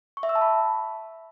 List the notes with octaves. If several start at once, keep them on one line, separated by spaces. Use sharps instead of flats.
C#6
E5
E6
A5
B5